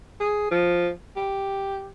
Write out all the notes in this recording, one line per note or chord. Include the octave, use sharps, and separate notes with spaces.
G#4
F3
G4